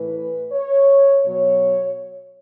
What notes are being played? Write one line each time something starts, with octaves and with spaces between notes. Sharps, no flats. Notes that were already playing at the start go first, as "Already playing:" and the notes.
Already playing: A2 E3 B4
C#5
B2 F#3 C#5